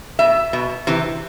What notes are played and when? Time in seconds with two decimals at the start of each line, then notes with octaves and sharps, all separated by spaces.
0.19 B2 E5
0.53 B2
0.87 C3 E3